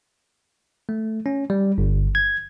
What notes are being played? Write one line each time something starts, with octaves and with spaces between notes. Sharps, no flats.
A3
C#4
G3
G1
G#6